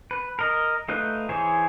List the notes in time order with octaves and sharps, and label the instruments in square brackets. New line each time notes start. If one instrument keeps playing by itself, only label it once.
[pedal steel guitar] B4
A#4 D#5
A3 D#4 F4 B4 F#6
E3 G#4 C5 C#5